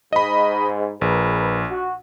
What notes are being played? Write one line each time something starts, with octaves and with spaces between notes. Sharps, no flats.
G#2 D#5 B5
A#1 G#4 A#4 B4
F#4